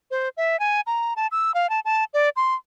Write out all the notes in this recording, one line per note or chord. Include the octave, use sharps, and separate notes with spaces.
C5
E5
G#5
A#5
A5
E6
F5
A5
A5
D5
C6